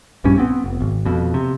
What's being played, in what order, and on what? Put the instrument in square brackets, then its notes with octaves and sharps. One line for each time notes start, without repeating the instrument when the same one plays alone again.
[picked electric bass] A#1 G2 G3 C#4
B3 C4
F1
G#1
F2 B2
C3